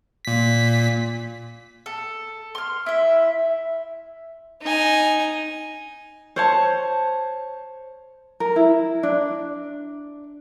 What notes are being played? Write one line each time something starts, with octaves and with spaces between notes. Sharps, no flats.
A#2 B6
A4
C6 F6
E4 E5
D#4 G#5
C5 C#5 A5
A#4
E4
D4